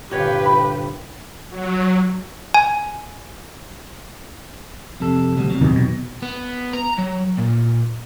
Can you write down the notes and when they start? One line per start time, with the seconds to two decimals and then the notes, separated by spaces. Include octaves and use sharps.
0.11 G1 C2 A#2 F#4 G4 B4 C#5
0.46 E4 B5
1.50 F#3
2.54 G#5
5.00 F2 C3 A4
5.36 D2 B2 G3
5.50 C3 F#3
5.61 E2 B2 D#3
5.76 B2
6.22 B3
6.73 A#5
6.98 F#3
7.37 A#2